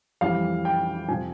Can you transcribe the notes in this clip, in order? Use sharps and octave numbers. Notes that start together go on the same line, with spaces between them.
F2 E3 G3 F5
G5
F2 C3 F3 G#5